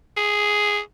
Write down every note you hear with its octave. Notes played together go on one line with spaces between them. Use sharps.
G#4